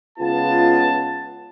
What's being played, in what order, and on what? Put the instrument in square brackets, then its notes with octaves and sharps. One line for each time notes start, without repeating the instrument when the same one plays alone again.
[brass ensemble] C#2 B3 F4 A5